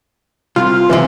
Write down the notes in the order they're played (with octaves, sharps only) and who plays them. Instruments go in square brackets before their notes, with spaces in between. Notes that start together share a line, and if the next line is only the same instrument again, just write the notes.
[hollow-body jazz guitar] C2 [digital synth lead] F4
[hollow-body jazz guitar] C#2 F#2 C3 [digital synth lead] E3